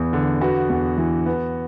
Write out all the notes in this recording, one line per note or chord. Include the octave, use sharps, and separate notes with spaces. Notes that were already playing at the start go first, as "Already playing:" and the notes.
Already playing: E2 B3
D3
B3 F#4
E2
E3
B3